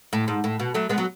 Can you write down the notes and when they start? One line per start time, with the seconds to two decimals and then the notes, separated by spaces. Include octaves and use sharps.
0.13 A2
0.28 G#2
0.44 A2
0.59 B2
0.74 F#3 A3
0.89 G#3 B3
0.98 F#3